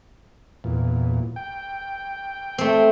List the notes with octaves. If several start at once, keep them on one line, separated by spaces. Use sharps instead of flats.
E2 A#2
G5
A3 C4